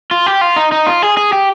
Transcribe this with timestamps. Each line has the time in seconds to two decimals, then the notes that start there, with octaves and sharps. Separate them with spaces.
0.11 F4
0.26 G4
0.41 F4
0.56 D#4
0.72 D#4
0.87 F4
1.02 G#4
1.17 G#4
1.32 G4